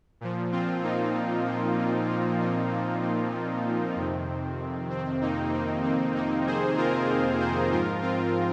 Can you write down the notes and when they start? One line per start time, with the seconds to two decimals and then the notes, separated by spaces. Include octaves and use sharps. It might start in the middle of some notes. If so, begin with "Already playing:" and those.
0.21 A#2 F3
0.52 C4 F4
0.83 A#3 D#4
1.14 C4
1.46 A#3
1.78 C4
2.09 C4 F4
2.39 A#3 D#4
2.71 C4
3.03 C4
3.96 F2 C3 D#3
4.90 C4
5.21 A#3 D#4
5.53 C4
5.84 C4
6.15 A#3 D#4
6.46 G#4 C5
6.77 F4 A#4
7.09 F4 A#4
7.40 G#4 C5
7.71 G#2 F3 F4 A#4
8.02 C4 F4